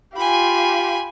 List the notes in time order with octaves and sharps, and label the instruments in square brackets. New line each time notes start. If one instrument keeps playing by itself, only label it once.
[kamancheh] F4 G4 [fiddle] G#5 B5